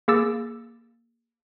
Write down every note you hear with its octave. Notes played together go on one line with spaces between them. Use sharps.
A#3 G#4 D6 E6 A6